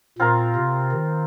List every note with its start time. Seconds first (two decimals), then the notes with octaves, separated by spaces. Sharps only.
0.19 A#2 C4 F4 A#4
0.56 C3
0.92 D#3